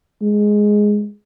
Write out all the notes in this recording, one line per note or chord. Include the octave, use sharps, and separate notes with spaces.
G#3